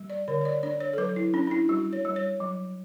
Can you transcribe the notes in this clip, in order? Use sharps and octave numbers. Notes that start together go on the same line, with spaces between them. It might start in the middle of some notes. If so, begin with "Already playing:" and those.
Already playing: G3
D5
D3 C#5
C#5
D5
D4 D5
C#5
A4
F#3 B4
E4
C#4 D4
D4
E4
G3 F#4
C#5
G3
C#5
F#3